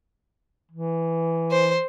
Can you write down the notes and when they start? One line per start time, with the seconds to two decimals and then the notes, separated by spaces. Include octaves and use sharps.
0.71 E3
1.51 C5